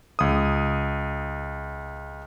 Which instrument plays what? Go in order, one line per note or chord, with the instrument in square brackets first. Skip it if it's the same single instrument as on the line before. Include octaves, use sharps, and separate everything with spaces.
[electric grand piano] C#2 D#6